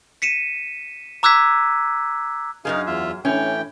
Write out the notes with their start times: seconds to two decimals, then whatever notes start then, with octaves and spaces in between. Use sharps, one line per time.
0.22 B6 C#7 D#7 E7
1.23 A#5 D6 E6 F#6 G#6 B6
2.65 F#2 C3 D#4 G#4 F5
2.87 E2 F4 E5
3.25 A2 E3 C#4 G5